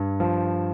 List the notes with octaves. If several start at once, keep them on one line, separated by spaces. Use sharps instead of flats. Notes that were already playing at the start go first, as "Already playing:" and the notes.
Already playing: G2
F3